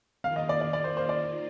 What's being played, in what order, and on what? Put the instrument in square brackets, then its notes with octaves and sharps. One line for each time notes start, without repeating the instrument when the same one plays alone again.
[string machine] D#3 A#3 F4 [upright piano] F5
[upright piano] D#5
D5
D5
D5
C5
C5
D5